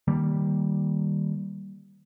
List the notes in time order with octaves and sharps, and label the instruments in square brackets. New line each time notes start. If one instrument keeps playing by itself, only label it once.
[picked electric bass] D#3 G3 A#3